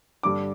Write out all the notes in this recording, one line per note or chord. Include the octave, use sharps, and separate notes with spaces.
G2 D3 G3 D4 D6